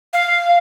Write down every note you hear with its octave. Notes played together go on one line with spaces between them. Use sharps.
F5